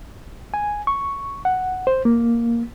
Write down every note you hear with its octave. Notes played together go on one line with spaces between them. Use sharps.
G#5
C#6
F#5
C5
A#3